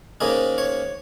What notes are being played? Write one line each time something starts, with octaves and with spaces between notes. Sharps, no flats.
G#2 D#3 A#3 C#4 D#5
C#5